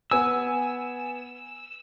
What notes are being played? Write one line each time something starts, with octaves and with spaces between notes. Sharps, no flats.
B3 G#5 E6